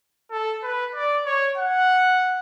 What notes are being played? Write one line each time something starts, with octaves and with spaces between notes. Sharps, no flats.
A4
B4
D5
C#5
F#5